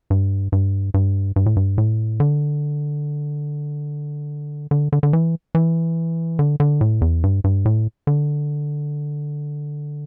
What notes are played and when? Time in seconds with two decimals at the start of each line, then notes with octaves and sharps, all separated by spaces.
0.10 G2
0.52 G2
0.94 G2
1.36 G2
1.46 A2
1.56 G2
1.78 A2
2.20 D3
4.71 D3
4.92 D3
5.03 D3
5.13 E3
5.55 E3
6.39 D3
6.60 D3
6.81 A2
7.01 E2
7.23 G2
7.44 G2
7.65 A2
8.07 D3